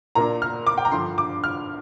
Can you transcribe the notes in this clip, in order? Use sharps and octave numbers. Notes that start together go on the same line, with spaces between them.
A#2 A#3 D4 A#5
F6
D6
G5
A#5
G2 D3 F3 C6
D6
F6